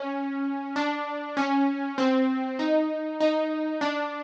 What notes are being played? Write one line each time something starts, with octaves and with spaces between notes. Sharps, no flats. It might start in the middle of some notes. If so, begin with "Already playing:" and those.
Already playing: C#4
D4
C#4
C4
D#4
D#4
D4